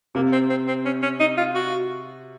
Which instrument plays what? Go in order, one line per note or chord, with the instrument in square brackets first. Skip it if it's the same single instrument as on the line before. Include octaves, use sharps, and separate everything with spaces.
[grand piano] C3 [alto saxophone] A#3
[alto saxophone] C4
C4
C4
C#4
C#4
D#4
F4
F#4